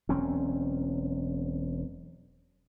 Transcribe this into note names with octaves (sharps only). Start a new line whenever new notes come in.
E1 F#3 C4 C#4